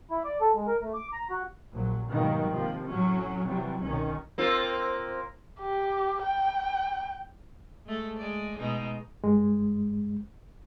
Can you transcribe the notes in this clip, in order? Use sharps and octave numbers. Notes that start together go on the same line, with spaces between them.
E4
D5
A4
G#3
A#4
A3
D6
A#5
F#4
A#1 F#3
G#2 B2 D#3 F#3 G3 A#3
C3 F3 A#3
A2 F#3 C#4
C3 E3 F#3 G3
C2 B2 D#3 C#4
A#3 C4 F4
G4
G5
G#3 A3 A4
G#3 D5
B2 G#3 D#4
G2 G#3